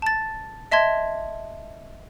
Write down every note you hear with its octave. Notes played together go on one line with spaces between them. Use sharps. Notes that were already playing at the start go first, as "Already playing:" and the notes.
A5 A6
D#5 E5 A5 C6 G#6